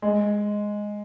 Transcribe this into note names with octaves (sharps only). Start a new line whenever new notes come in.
G#3